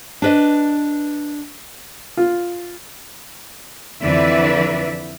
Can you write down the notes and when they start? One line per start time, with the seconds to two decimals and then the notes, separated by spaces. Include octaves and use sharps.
0.22 D4 B4 D#5
2.17 F4
4.02 F2 D3 E3 B4 D5 E5